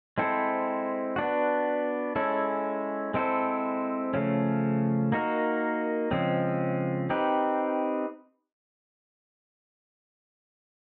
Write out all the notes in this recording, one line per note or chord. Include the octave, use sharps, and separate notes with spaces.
G#3 C4 E4 A4 C5
B3 D4 F#4
G#3 C#4 E4 A4
G#3 C4 E4 A4 C5
C#3 F3 A3 C#4
A#3 D#4 F#4 A#4
C#3 F3 G#3 C4
C4 D#4 G4 B4